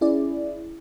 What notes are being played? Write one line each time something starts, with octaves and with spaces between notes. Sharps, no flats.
C#4 E4 G#4 D5